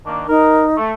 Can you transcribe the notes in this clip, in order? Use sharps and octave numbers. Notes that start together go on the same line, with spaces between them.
D#3 A#3 D4
D#4 A#4
A3